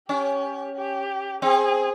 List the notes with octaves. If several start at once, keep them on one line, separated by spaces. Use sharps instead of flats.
C#4 G4
G4
C4 G#4